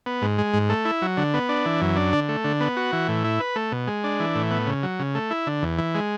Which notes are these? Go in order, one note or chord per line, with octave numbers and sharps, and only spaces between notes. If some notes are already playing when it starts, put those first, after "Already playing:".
B3
G#2
G#3
G#2
A3
E4
F#3
D3
B3
D4
E3
F#2
D4
D3
A3
D3
B3
F#4
E3
A2
E4
B4
A3
B2
G#3
D4
E3
A2
B3
C#3
F#3
C#3
A3
E4
D3
E2
E3
G#3